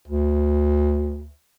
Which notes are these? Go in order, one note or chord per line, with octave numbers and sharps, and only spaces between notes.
D2